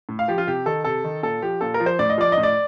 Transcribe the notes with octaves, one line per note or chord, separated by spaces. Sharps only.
A2
F5
F3 G4
F4
C3 G4
D#3 A4
C3 A4
D#3
A#2 A4
F3 G4
A#2 A4
A#4
F3
C5
A2 D5
D#5
F3 D5
D#5
A2
D5